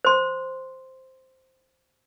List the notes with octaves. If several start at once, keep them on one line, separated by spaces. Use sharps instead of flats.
C5 C6